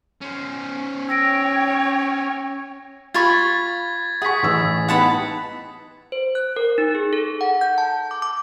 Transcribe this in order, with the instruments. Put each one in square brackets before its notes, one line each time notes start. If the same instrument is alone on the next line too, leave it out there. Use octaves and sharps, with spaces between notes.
[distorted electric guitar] C#4 C5
[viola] C#5 [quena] G5 [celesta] E6 A#6 D7
[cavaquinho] F4 B5 C#6 [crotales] G#6 A6 B6
[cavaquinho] G#4 [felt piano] F#5 C#6 [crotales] D#6 B6
[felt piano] A1 E3 E6
[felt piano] B3 D#4 [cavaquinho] F#5 A5 B5
[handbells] C5
F#6
A#4
D#4
G#4
A4
F#5
G6
A5
D6
D6